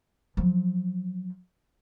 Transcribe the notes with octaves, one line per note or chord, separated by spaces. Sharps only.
F3 F#3